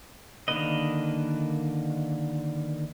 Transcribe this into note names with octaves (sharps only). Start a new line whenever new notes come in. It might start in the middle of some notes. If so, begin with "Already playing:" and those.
D3 D#3 A#3 B4 D#5